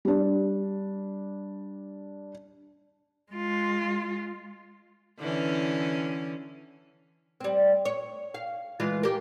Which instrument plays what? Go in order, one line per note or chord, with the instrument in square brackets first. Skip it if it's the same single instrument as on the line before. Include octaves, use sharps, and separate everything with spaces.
[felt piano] G3 D4
[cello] G#3 F4
[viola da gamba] D3 E3 C#4
[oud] G3 C4
C#5
F5
E3 G#3 F4
G4 A#4